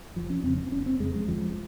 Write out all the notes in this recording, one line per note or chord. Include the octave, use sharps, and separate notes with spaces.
F1 F3
C#4
F2 C#3 C4
C4
F1 C#4
C4
F2 C#3 G#3
G#3
G1 F3